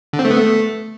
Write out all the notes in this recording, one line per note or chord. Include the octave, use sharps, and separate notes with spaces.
D3
C4
A3
B3
A3